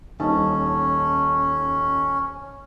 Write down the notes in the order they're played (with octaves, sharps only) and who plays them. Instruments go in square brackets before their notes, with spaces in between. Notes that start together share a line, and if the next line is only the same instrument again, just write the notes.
[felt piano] D#1 D#4 A5 [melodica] C#4